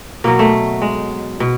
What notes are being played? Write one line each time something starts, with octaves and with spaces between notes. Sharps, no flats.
B2 F#3 A#3
A3
G#3
B2